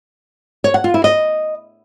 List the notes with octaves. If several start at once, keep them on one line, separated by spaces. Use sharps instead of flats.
C#5
F#5
F4
E4
D#5